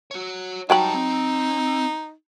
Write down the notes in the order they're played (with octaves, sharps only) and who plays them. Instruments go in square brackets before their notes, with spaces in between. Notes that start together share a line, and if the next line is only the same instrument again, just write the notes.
[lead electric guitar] F#4 C#5
[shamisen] F#3 G5 B5 [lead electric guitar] G3 A5 [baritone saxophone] D#4
[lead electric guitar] C4